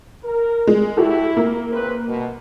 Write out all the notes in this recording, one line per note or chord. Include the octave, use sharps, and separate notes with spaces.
A#4
G#3
E4 F#4 G4 A4
A#3
C#3 C4 B4
C2 B2